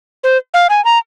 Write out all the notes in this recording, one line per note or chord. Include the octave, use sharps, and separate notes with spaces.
C5
F5
G#5
A#5